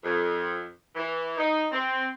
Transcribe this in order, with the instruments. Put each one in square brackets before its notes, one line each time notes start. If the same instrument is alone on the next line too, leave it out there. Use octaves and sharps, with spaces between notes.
[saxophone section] F2
E3
D#4
C4